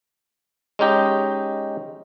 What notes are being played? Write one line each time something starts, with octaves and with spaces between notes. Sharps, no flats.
G#3 C#4 D#4 G4 D#5